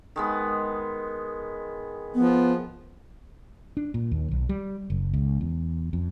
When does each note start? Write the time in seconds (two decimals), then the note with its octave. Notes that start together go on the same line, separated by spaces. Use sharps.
0.16 D#3 G#3 B3
2.14 F3 B3
3.77 D4
3.94 A#2
4.12 D#2
4.31 B1
4.49 G3
4.90 F#1
5.14 C#2
5.41 E2
5.93 F2